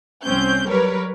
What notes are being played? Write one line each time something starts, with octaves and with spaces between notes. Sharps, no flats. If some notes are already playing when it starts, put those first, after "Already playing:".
C2 C4 C#4 G6
F#3 G3 A#4 B4 C#5